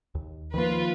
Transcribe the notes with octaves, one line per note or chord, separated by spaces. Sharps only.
D#2
D#3 F3 A#3 F4 B4